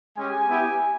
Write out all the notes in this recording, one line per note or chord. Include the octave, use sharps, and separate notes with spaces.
G#3 C#4 G4 G#5
B3 E4 G4